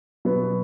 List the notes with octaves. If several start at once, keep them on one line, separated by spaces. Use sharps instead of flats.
B2 F#3 B3